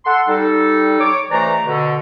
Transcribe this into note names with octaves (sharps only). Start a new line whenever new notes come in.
A4 F#5 C6
G3 D#4 A4
C#5 D6
C#2 E3 A3 C5 D5 A#5
B2 D3